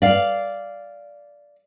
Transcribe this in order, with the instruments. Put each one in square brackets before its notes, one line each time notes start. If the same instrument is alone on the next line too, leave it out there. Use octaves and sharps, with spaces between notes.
[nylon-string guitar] D5 F5